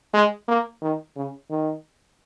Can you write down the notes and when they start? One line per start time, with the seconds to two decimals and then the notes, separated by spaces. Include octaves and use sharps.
0.13 G#3
0.48 A#3
0.82 D#3
1.16 C#3
1.50 D#3